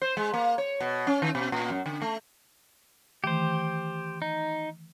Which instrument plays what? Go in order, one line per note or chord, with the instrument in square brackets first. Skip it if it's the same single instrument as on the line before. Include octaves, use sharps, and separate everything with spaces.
[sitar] C5
G#3
A#3
C#5
B2
C#4
D#3
B2
A#2
F#2
D3
A3
[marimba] D#3 E3 A3 [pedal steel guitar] G4 C5
[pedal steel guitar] D#4